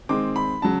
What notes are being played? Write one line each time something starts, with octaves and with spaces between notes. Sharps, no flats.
D#3 G#3 C4 D6
B5
C#3 F#3 A5